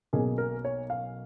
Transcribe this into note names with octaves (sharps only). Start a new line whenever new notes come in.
B1 B2 A#3 C#4 G#4
A#4
C#5
F5